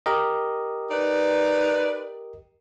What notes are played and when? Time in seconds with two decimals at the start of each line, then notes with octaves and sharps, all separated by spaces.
0.06 G4 A#4 D#5
0.89 D#4 B4 D5